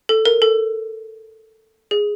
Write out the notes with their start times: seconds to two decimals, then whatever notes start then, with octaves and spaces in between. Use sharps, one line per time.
0.09 A4
0.25 A#4
0.42 A4
1.91 G#4